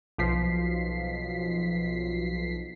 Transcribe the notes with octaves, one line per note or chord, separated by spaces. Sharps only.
B1 F3 B6 C7